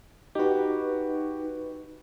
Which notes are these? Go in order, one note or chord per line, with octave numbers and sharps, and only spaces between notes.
D#4 F#4 G4 B4